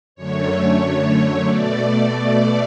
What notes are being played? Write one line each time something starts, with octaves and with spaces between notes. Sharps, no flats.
F#2 D3 A3 C#5
B2 A3 D5